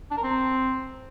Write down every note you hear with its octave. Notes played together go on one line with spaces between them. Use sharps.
D4
A#4
C4